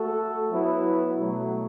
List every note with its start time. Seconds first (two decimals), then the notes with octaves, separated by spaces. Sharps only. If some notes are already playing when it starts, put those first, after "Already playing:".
Already playing: A3 F#4 A4
0.51 F#3 B3 E4 B4
1.18 B2 F#3 A3